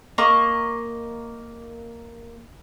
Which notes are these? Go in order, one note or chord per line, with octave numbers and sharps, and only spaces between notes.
A#3 D#5 C#6